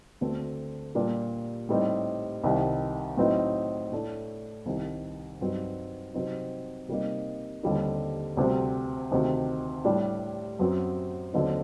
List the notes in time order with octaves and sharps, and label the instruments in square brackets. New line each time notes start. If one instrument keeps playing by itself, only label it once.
[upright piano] D2 D3 A3 C4
A#2 G3 A#3 D4
A2 G3 C4 D#4
C2 C3 D#3
A2 F#3 C4 D#4
A2 A3 D4
C2 C3 D#3
G2 F#3 C4 D#4
C3 F#3 C4 D#4
C3 G3 A#3 D#4
D#2 D3 G3 C4 D#4
D2 C3 G3 C4
D2 C3 D#3
A2 G3 D4
F#2 F#3 C4
D#2 D3 F#3 C4 D#4